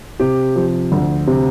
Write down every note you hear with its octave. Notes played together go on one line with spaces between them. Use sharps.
C3 G4
F3
D2
C3